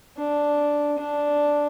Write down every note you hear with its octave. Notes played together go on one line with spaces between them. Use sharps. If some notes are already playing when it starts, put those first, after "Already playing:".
D4
D4